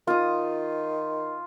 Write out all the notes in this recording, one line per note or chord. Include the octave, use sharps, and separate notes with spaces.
D#3 F4 D#6